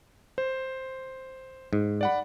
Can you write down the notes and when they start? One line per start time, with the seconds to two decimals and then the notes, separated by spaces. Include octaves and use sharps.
0.38 C5
1.73 G#2
2.01 D5 F#5 B5